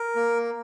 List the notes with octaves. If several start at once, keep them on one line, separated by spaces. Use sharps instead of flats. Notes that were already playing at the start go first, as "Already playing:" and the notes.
Already playing: A#4
A#3